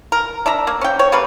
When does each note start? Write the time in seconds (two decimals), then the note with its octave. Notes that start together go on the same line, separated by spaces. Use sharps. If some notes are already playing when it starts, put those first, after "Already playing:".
0.12 A#4
0.46 D4 E5 A#5
0.67 A#3
0.81 C#4 G5
0.99 C4 C#5
1.12 C#3 G3 A#3 B4